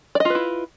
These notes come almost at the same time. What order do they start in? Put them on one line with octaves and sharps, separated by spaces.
D5 D#5 F4 B4 E4